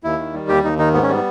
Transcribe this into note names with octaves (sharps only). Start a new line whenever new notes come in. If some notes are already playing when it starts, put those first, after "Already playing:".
D#2 E4
D#3
G3
D#2 G4
D#2 D#4
D#3 D#4
G#2 B3
C#4
G3 B3